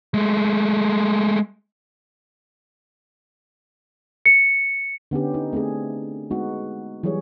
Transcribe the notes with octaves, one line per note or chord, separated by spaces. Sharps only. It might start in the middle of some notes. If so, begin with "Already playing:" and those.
G#3 A3
C#7
D3 B3 C#4 G4
D#4
A3 C4 D4 G#4
G#3 B3 D#4 F#4
E3 F#3 G3 G#4 C#5